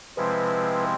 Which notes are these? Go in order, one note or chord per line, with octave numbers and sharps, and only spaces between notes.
C3 F3 G#3 C4 E4 B4